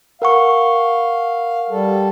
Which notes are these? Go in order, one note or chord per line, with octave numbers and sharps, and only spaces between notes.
A#4 F5 F#5 C#6
G3 A4